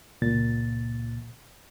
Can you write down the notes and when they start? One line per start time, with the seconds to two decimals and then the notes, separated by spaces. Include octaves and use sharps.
0.22 C#2 A#2 A6